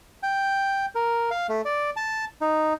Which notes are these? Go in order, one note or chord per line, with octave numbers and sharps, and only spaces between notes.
G5
A#4
F5
A3
D5
A5
D#4